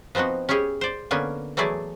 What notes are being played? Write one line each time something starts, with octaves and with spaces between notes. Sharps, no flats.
F3 B3 C4 D#4 F#4
C#4 E4 G4 G#4 C#5
C5 D5
D3 A#3 B3 C#4 G#5
E3 F#3 A3 E4 G#4 D5